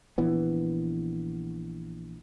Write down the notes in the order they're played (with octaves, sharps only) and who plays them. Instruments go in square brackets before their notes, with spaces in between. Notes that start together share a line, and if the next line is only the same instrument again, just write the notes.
[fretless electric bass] A#1 E3 B3